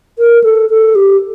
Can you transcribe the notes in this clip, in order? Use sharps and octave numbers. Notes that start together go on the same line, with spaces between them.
A#4
A4
A4
G4